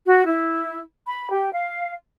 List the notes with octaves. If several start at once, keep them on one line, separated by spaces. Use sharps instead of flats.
F#4
E4
B5
G4
F5